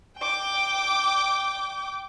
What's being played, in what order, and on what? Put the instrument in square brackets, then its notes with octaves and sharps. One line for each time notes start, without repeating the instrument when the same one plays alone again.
[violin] G5 D6